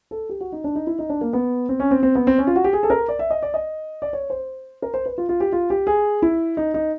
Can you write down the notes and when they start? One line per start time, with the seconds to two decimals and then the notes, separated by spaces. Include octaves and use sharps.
0.11 A4
0.29 G4
0.41 F#4
0.52 D#4
0.64 D4
0.75 D#4
0.87 E4
0.99 D#4
1.10 D4
1.21 A#3
1.33 B3
1.69 C4
1.80 C#4
1.91 C4
2.03 C4
2.15 B3
2.27 C4
2.38 C#4
2.47 F4
2.56 F#4
2.64 G4
2.73 G#4
2.83 A4
2.90 A#4
3.08 D5
3.19 E5
3.31 D#5
3.43 D5
3.54 D#5
4.02 D5
4.13 C#5
4.30 C5
4.82 A#4
4.94 C5
5.06 B4
5.18 F4
5.29 F4
5.40 G4
5.52 F4
5.70 G4
5.87 G#4
6.22 E4
6.57 D#4
6.74 D#4